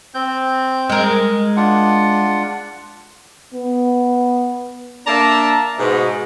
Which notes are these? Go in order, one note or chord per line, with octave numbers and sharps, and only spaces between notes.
C4 G6
G#3 A#4
D4 F4 F#5
B3
A#3 D4 D5 E5 A5 A#5
G#2 B2